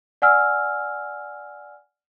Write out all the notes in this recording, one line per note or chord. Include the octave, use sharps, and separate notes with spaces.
D5 F#5 G#5 E6 F6